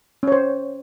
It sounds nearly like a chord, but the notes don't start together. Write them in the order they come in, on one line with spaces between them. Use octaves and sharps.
C#4 C#5 C5